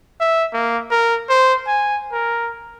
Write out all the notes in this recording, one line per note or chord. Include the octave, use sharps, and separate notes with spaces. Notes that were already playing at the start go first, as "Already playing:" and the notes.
E5
A#3
A#4
C5
G#5
A#4